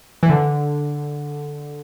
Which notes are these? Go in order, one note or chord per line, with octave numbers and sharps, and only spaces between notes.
E3
D3